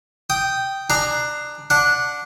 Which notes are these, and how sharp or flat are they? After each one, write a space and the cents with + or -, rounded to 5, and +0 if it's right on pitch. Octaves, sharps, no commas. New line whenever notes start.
G5 -5 D#6 +0
D4 +20 G#4 +0 A#5 +0
D4 +0 F#5 -20